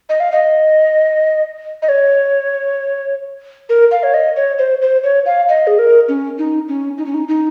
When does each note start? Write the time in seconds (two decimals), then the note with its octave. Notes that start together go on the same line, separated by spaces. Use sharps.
0.09 D#5
0.20 F5
0.32 D#5
1.82 D#5
1.89 C#5
3.69 A#4
3.91 F5
4.03 C#5
4.14 D#5
4.36 C#5
4.59 C5
4.82 C5
5.04 C#5
5.26 F5
5.49 D#5
5.67 G#4
5.79 A#4
6.09 C#4
6.39 D#4
6.68 C#4
6.98 D#4
7.06 C#4
7.14 D#4
7.28 D#4